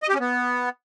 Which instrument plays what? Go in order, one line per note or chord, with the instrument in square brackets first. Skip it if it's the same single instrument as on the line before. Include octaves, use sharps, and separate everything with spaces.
[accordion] D#5
G4
C#4
B3